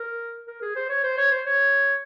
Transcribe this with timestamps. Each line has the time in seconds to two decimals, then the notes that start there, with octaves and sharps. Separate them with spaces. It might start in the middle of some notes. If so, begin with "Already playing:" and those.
Already playing: A#4
0.47 A#4
0.62 G#4
0.76 C5
0.89 C#5
1.04 C5
1.17 C#5
1.31 C5
1.46 C#5